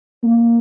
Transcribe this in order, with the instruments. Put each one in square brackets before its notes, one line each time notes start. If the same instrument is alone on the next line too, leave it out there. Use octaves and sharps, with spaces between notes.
[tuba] A#3